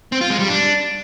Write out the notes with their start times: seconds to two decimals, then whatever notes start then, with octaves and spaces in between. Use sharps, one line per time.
0.12 C4
0.21 F4
0.30 G#3
0.39 G3
0.48 D4